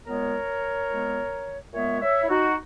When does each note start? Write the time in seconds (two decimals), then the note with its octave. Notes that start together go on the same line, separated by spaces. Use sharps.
0.05 A#2 G#3 B3 A#4 C#5
0.89 A#2 G#3 B3
1.73 A#2 G#3 B3 C#5 E5
2.01 C#5 E5
2.22 E4
2.29 D#4 F#4